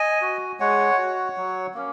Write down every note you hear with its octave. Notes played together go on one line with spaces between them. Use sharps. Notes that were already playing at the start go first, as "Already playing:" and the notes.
Already playing: D#5 G#5
F#4
G#3 C#5 F#5
F#4
F#3
A#3 C#4